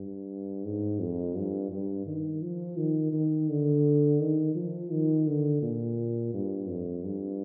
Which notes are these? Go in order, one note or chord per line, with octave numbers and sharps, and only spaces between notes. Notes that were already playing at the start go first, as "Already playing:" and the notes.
Already playing: G2
G#2
F2
G2
G2
D#3
F3
D#3
D#3
D3
D#3
F3
D#3
D3
A#2
G2
F2
G2